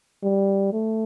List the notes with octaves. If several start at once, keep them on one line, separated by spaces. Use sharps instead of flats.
G3
A3